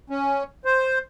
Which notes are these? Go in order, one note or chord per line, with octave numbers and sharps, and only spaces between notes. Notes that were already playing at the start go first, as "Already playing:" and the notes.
C#4
C5